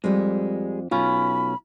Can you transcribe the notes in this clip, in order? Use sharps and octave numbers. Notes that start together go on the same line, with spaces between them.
F2 G3 G#3
B1 C#4 F4 B5